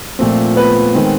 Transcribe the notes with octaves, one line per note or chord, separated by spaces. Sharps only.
A#2 F3 A3 C4
B3 B4
D#3 G#3 C4